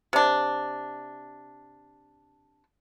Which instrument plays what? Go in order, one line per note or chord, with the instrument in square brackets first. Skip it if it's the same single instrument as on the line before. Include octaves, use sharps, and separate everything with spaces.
[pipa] C3 D4